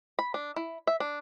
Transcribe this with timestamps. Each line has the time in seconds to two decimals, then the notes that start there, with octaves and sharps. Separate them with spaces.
0.19 B5
0.34 D4
0.56 E4
0.87 E5
1.00 D4